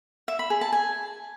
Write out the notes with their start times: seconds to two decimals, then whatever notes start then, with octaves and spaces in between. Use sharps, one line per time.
0.28 E5
0.39 B5
0.50 G#4
0.61 A5
0.72 G#5